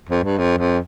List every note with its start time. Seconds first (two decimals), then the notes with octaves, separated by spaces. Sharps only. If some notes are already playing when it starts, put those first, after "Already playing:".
0.09 F2
0.24 G2
0.38 F2
0.58 F2